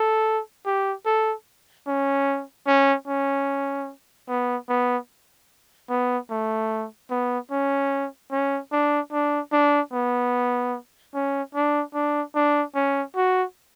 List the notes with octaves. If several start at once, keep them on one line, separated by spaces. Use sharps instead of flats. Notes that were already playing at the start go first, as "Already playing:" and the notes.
Already playing: A4
G4
A4
C#4
C#4
C#4
B3
B3
B3
A3
B3
C#4
C#4
D4
D4
D4
B3
C#4
D4
D4
D4
C#4
F#4